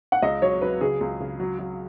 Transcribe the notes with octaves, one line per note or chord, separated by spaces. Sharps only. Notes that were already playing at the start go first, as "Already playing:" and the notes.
F#5
C#2 D#5
F#3 C#5
F#3 B4
C#3 G#4
C#2
C#3
F#3
F#3